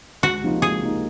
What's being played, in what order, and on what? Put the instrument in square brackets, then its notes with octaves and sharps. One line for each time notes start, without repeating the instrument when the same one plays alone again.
[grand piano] C#2 [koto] F#4
[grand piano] C3 F3 A#3 D#4
[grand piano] C#2 [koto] G#4
[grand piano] C3 F3 A#3 D#4